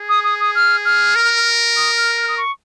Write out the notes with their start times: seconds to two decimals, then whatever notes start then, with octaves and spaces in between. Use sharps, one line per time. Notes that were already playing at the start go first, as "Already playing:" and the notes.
Already playing: G#4
0.09 D#6
0.24 D#6
0.40 D#6
0.55 F6
0.85 F6
1.16 A#4
1.76 D#6
1.97 F6
2.17 F6
2.28 D#6
2.37 C#6